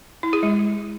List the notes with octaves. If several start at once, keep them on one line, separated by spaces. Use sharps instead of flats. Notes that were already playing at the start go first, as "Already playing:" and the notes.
E4
G#4
G#3